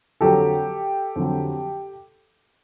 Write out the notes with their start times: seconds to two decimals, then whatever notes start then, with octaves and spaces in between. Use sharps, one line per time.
0.21 F2 D3 F#3 G4 A4
1.16 F2 D3 F#3